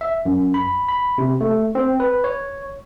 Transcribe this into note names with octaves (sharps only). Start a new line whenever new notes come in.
E5
F#2
B5
B5
C3
A3
C4
B4
C#5